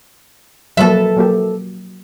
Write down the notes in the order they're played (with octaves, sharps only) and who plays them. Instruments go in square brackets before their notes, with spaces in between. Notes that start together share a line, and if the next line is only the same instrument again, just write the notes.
[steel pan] F3 F#3 A#3 [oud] A4 B4 E5
[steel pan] F#3 A#3 G4